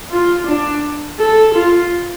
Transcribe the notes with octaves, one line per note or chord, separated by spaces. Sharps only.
F4
D4
A4
F4